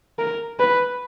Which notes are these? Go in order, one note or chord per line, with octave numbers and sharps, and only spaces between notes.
A#4
B4